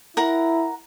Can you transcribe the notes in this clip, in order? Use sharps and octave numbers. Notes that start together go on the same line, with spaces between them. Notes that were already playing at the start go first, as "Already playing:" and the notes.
E4 A#4 F#5 A#5